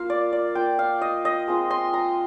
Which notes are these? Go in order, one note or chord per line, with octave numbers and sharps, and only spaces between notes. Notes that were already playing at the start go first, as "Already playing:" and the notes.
Already playing: A#3 F4 F5
D5
D5
A#3 F4 G5
F5
D#5
D#5
G#3 C4 F4
C6
A#5